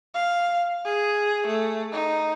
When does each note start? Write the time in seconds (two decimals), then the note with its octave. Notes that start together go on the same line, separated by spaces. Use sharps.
0.15 F5
0.85 G#4
1.47 A3
1.92 D#4